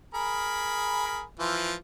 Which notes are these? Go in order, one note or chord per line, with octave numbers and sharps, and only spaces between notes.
G#4 A#4 B5
E3 F3